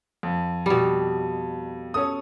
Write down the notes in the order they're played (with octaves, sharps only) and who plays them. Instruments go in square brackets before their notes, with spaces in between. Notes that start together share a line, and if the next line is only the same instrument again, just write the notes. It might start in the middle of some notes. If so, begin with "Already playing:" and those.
[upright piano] F2
[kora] B2 G3
[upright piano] C#4 A4 D#6